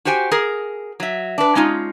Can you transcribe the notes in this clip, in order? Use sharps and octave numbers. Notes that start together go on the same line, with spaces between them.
F#4 G4 C5 G5 G#5
G#4 A#4
F#3 E5
D4 B4
G#3 C#4 D#4 F4